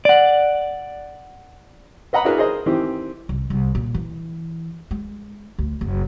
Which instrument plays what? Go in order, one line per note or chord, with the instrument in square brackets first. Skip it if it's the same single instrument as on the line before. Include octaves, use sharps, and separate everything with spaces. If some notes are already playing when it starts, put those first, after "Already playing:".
[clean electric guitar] D5 F#5
[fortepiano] B4 D#5 F#5 A#5 B5
D4 E4 F#4 G#4 A#4 B4
G#4 A#4 C5 D#5
D#3 E3 C4 G4
[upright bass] C2
C2
A#2
E3
G#3
D2
F#1